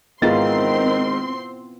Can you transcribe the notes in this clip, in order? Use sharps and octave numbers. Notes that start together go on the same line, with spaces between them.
G#2 D#3 B3 C4 E4 F4 C6 A6